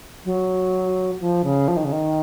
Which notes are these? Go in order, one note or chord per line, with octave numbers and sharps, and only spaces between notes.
F#3
F3
C#3
F3
D#3
C#3
D#3